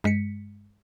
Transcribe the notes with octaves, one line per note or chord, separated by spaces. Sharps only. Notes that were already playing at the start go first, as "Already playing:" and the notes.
G2 G#3 B6 C#7